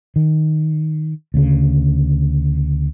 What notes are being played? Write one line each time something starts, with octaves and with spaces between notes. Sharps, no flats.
D#3
D2 C#3